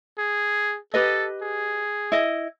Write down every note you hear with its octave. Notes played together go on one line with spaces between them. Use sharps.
G#4
G4 A4 B4 D#5
G#4
E4 D#5